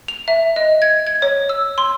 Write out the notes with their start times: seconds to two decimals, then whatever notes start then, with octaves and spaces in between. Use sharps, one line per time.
0.08 F7
0.28 E5
0.56 D#5
0.82 G#6
1.07 G#6
1.22 C#5
1.49 E6
1.78 C6